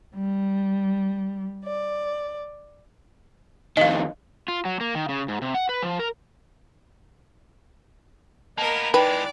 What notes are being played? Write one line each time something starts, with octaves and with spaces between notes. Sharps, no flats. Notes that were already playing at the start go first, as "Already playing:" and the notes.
G3
D5
F2 D#3 D#5 F5
F4
F#3
A#3
D#3
C#3
G#2
C3
F#5
B4
F3
A#4
A#3 B3 A#4 D#5 A5
E3 G#3 D#4 B4 D5 G5 B5